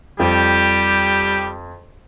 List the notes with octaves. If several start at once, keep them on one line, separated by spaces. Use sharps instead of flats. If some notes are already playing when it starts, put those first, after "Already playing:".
F2 G3 G4